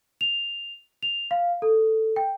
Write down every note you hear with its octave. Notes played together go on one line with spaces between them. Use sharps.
F7
F7
F5
A4
G5